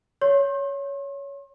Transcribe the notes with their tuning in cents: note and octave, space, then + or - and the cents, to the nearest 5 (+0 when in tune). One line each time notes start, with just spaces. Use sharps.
C#5 +15 C6 +45